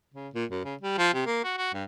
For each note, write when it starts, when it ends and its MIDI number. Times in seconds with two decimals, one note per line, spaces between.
0.14 0.28 49
0.34 0.45 46
0.51 0.62 42
0.64 0.75 49
0.81 0.96 55
0.98 1.11 53
1.14 1.25 48
1.26 1.40 58
1.44 1.57 66
1.57 1.73 66
1.74 1.84 43